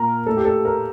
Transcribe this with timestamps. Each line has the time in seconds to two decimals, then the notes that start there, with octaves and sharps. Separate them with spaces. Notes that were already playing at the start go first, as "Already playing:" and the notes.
Already playing: A#2 A#4
0.26 A2 A4
0.37 G4
0.45 A4
0.65 A#4